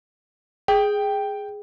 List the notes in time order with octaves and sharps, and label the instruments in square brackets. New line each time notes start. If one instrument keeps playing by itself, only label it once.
[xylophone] G#4 [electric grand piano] G5